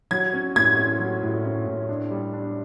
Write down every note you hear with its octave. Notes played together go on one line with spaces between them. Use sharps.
F#3 G#6
C#4
A2 G#6
C#4
F#3
A2
C#4
A2
D4
G3
D4